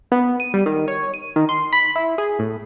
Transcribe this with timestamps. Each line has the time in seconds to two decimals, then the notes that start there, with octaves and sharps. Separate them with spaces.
0.12 B3
0.40 D#7
0.54 G3
0.66 D#3
0.88 C#5
1.14 D#7
1.36 D#3
1.49 C6
1.73 B5
1.96 E4
2.18 G#4
2.39 A2